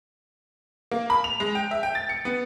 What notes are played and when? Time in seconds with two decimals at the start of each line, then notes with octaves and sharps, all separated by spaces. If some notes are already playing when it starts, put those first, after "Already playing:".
0.91 A#3
1.10 B5
1.24 F7
1.40 G#3
1.55 G5
1.71 E5
1.83 G5
1.95 A6
2.09 C#7
2.25 B3